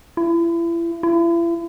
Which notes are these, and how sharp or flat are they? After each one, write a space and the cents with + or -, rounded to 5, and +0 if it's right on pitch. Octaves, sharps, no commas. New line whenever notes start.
E4 +35
E4 +40